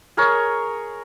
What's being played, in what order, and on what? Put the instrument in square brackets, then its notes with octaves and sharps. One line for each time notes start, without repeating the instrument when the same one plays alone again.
[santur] G#4 A#4 C#5